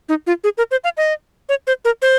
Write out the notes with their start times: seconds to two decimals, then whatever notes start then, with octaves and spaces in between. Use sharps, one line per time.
0.09 D#4
0.27 F4
0.44 G#4
0.58 A#4
0.71 C5
0.84 F5
0.97 D#5
1.49 C#5
1.67 C5
1.85 A#4
2.02 C5